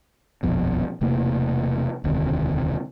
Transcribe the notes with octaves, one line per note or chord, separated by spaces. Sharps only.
D#1 A#1 F2 B2
E1 C3 A3 A#3
E1 D2 C3 D#3